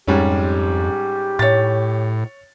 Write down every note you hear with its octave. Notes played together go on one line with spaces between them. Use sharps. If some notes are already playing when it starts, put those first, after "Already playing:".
F2 G#2 G3 C#4 G4
A2 C#5 A6